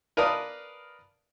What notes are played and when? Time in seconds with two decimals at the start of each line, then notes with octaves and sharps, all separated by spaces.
0.17 A#4 B4 D5 F5 A5 D#6